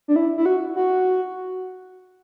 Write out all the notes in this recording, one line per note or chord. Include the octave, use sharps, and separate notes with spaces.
D4
E4
E4
F#4
F#4